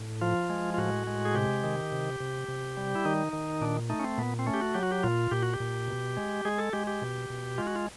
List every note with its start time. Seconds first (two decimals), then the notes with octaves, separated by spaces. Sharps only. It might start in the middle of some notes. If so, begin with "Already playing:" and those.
Already playing: A2
0.21 F3 F4
0.50 G#3
0.74 F4
0.78 A2 F#4
1.07 G#3
1.25 G#4
1.35 C3 G4
1.64 D#3
1.92 C3
2.20 C3
2.48 C3
2.77 G3
2.95 E4
3.05 D#3 D#4
3.33 D#3
3.61 A#2 D4
3.90 A3 D#4
3.99 C#4
4.04 C4
4.18 A#2 B3
4.39 C4
4.46 A3 C#4
4.54 G4
4.61 F#4
4.74 F#3 G4
4.83 F#4
4.92 G4
5.03 A#2 F4
5.31 A#2 G4
5.42 F#4
5.54 G4
5.60 A#2
5.88 B2
6.17 G#3
6.45 G#3 G#4
6.58 A4
6.73 G#3 G4
6.87 G4
7.02 B2
7.30 B2
7.58 G#3 F4
7.67 F#4
7.75 F4